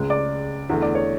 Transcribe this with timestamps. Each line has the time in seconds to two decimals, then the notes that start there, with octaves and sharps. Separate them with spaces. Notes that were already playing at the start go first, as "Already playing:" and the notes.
Already playing: C#2 C#3 G#3
0.10 D5
0.69 E2 D3 A3
0.82 D5
0.95 C#5